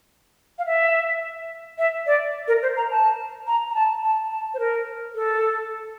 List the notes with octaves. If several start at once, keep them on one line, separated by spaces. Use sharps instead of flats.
F5
E5
E5
D5
A#4
C5
A#5
A5
A#5
A#5
A5
A5
A5
C5
A#4
A4